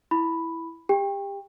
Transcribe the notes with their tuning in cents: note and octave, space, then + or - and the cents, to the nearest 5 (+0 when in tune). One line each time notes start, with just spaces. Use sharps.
E4 +0 B5 +0
G4 +25 G5 +25